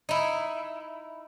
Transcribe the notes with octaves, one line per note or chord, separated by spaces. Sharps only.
D#4 E4